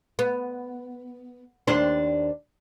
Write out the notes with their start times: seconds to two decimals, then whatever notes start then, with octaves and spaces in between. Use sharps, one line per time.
0.19 B3
1.67 D#2 D4 C5